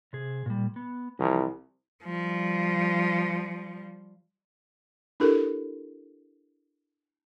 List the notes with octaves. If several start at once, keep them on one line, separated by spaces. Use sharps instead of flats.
C3 G#4
A#2 G3
B3
C2 E3 F3
F3 G3
D4 E4 G4 A4 A#4